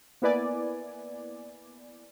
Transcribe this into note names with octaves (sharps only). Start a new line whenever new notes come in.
A#3 B3 E4 B4 D5 G#5